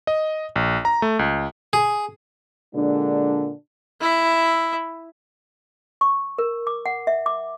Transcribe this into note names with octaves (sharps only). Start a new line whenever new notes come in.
D#5
A#1
A#5
A3
C#2
G#4
A#2 D3 G#3 D4
E4 E5
C#6
A#4
D6
F#5
E5
D6